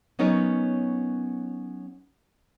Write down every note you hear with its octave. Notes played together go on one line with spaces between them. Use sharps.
F#3 B3 C#4 D#4 A#4 C#5